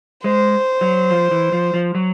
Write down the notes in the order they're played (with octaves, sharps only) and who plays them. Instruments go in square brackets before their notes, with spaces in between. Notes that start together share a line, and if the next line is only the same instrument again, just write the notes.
[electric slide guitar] G#3 [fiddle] C5
[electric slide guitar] F#3
F3
E3
F3
F3
F#3